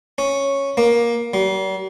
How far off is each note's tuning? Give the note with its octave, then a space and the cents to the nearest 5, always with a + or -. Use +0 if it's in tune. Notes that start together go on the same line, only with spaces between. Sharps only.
C#4 -5
A#3 +15
G3 -45